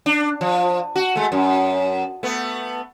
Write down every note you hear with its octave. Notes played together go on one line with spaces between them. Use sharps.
D4
F3
F#4
G#3 A3
F#2
A3 B3